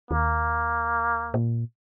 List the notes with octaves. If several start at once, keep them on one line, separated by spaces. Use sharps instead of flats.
D#2 A#3
A#2